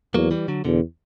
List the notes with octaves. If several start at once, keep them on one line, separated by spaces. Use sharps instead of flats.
E2 F#3 A#3
E3 G3
D3 F#3
E2 B2 D3